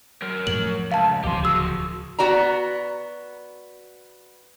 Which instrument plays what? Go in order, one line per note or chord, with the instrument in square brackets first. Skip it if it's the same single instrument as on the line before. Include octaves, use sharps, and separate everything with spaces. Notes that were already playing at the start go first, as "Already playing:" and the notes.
[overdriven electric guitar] F#3 A#4
[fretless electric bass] F2 A2 [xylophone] F#7
[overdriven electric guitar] C#2 [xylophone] F5 A5
[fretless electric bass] D1 C#2 F3 [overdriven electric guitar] G4 C6
[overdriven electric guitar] F#4 G#4 [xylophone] E6
[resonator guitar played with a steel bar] B3 F#4 D5 A#5